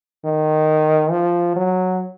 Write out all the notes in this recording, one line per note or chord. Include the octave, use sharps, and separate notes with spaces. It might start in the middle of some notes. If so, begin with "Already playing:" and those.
D#3
F3
F#3